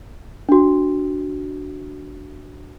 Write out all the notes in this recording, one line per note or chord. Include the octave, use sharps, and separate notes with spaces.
D4 F#4